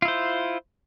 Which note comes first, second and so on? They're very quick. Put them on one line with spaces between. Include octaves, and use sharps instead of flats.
F4 E4 C5